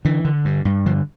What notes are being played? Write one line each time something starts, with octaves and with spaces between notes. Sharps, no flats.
D3 E3
D3
G2
G2
D3 F3